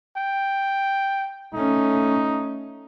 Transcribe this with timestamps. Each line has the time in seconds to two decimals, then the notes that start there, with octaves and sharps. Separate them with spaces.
0.17 G5
1.54 A3 C#4 D#4